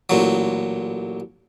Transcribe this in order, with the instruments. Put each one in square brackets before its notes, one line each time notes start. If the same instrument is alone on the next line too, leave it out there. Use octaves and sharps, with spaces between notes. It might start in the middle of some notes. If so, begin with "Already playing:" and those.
[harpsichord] A1 A#2 F#3